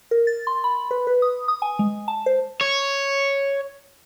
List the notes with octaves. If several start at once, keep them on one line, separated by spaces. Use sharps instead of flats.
A#4
A6
C6
B5
B4
B4
D#6
D#6
G#5
G#3
A5
C5
C#5